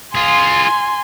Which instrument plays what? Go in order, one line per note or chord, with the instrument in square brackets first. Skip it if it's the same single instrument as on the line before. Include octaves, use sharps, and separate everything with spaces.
[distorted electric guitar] F4 G#4 [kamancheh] G#5 C6